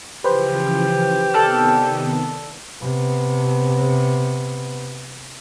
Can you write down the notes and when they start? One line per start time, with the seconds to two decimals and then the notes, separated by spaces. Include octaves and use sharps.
0.24 C#3 E3 F3 G4 B4 C5
1.34 C3 D#3 B3 A4 D5 F6
2.82 C3 B3